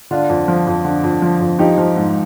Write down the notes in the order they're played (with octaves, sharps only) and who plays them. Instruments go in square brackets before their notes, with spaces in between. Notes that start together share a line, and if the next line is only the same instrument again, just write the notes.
[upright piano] D3 D4 F4
F2
F3
F2
D3
F2
F3
F2
F3 D#4 G4
F3
G#2